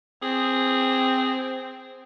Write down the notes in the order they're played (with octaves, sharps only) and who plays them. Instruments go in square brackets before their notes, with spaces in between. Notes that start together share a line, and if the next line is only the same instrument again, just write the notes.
[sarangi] C4 [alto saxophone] G#4